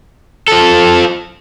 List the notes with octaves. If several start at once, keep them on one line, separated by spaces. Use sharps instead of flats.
F3 A4